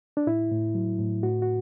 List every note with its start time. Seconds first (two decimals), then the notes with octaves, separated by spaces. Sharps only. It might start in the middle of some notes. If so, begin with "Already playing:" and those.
0.17 D4
0.27 A2 E4
0.51 A2
0.75 F#3
0.99 A2
1.23 A2 F#4
1.42 F#4